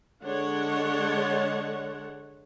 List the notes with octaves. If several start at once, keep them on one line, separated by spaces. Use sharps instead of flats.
D3 G#3 D4 C#5 F#5